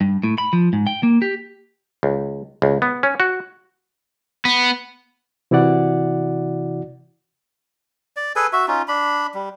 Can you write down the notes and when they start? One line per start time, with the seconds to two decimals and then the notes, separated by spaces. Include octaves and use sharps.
0.01 G2
0.23 A2
0.38 B5
0.53 F3
0.73 G#2
0.87 G5
1.03 A#3
1.22 G4
2.03 C#2
2.62 C#2
2.82 B3
3.03 C#4
3.20 F#4
4.45 B3
5.51 C3 E3 E4 F#4 D5 F#5
8.17 D5
8.36 G#4 A4 B4 G#5
8.53 F#4 E5
8.68 C#4 D#4 F4
8.88 D4 B5
9.34 G3